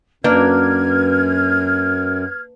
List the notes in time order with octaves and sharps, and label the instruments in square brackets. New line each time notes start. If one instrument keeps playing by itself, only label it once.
[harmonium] F#2 [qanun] A#3 D4 [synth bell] B4 [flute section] F6 G#6